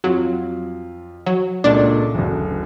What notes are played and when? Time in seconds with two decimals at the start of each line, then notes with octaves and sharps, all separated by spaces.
0.04 F2 F#3 F4
1.26 F#3
1.64 C#2 A#2 A3 D4
2.15 F#1 D2